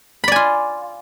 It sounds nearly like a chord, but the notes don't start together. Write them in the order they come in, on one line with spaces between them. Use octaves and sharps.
B5 D5 G#5 F4